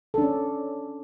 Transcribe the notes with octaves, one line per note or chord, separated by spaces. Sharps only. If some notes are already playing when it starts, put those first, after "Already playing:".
C#4 D4 A4